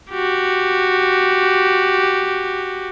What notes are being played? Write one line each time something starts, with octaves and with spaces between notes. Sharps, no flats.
F#4 G4